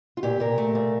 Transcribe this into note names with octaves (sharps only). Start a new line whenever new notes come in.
F4
A#2 G4
A#2 A#4
A3
A#2